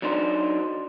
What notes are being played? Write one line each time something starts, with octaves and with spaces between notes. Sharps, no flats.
F#3 D4 D#4 C5